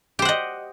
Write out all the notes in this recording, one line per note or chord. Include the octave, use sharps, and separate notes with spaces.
G4 C5 D#5 F#5